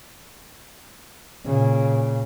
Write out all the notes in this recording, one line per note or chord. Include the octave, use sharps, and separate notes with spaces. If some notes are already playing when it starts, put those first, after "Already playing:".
A#2 C#3